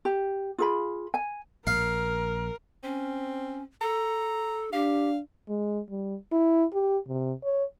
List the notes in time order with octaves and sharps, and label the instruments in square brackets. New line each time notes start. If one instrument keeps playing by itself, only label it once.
[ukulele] G4
F4 G#4 B5
G#5
[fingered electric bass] A#1 [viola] A#4 [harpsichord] F5
[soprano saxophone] C4 [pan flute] C#4
[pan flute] A4 [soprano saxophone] A#5
[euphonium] D4 [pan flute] G4 [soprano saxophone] F5
[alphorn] G#3
G3
E4
G4
C3
C#5